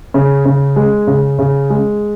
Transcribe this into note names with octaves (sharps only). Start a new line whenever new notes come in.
C#3
C#3
G#3
C#3
C#3
G#3